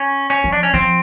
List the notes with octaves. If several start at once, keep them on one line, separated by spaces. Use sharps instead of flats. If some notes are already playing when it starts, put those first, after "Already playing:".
Already playing: C#4
C#4
F3
D4
C#4
F3 C4